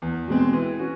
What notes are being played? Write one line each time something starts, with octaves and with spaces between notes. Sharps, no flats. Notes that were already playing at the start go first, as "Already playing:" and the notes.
E2
B2 G#3 C4
E3
C#4 F#4